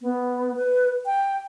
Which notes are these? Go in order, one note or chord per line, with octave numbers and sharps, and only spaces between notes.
B3
B4
G5